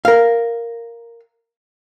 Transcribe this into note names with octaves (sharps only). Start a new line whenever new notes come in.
A#4 F5